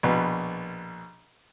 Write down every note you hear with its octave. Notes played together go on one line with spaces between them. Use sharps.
A#1 B2 B4